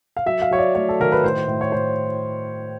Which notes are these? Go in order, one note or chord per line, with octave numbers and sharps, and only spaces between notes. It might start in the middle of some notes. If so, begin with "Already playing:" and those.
F5
F#3 E5
F5
F#3 C#5
D5
A3 C#5
A4
D#3 A#4
B4
A2 C5
A2
C#5
A2 C5